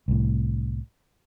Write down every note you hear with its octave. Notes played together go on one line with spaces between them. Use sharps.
C2 A2